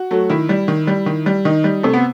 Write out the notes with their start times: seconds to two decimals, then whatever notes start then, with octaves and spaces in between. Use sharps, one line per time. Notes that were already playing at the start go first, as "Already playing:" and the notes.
Already playing: F#4
0.11 F#3 A3
0.30 D#3 E4
0.49 G3
0.68 D#3
0.87 G3
1.06 D#3
1.26 G3
1.45 D#3 D#4
1.64 G3
1.83 C3 A3
1.94 B3